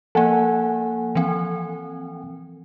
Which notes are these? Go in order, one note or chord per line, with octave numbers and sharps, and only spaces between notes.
F3 A#3 A4 F#5 G#5
E3 F3 C4